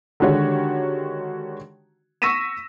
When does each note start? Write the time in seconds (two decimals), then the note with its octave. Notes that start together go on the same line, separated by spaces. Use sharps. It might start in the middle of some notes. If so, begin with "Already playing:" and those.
0.20 D3 D#3 G#3 F#4 G4 C#5
2.22 C#6 E6 A#6 B6 D#7 E7